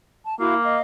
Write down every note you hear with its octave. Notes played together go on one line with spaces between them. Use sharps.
A5
A#3 E4 F#4 F5
D#5 F5